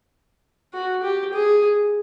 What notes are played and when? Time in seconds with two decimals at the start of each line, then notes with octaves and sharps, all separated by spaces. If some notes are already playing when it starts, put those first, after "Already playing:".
0.74 F#4
1.03 G4
1.33 G#4